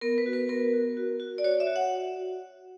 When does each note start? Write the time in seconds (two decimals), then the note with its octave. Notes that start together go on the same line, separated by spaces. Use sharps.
0.01 B3 A#4
0.18 B4
0.26 F#4
0.33 B4
0.49 B3 A#4
0.73 F#4
0.97 F#4
1.20 F#4
1.38 D5
1.44 F#4 C#5
1.60 E5
1.67 F#4
1.76 F#5